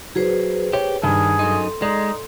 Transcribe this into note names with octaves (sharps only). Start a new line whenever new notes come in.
F#3 G#4 B4 C5
G4 C#5
G2 D#3 G#4
F#2 D#4 A4 C6
G#3 D#4 D5